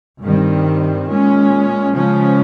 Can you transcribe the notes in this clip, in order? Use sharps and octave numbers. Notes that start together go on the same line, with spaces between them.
G2 D#3 G3 C4
A#2 G#3 C#4
C#3 F3 G#3 C#4